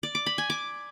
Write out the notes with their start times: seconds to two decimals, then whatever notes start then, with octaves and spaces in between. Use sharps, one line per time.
0.03 D5
0.15 D6
0.26 B5
0.38 G#5
0.50 D6